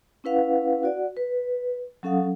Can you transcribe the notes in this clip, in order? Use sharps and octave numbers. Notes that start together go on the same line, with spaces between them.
C#4 E4 B4 F5 F#5
F#4 D5 F#5
B4
F#3 C#4 A4 F5 F#5 D#6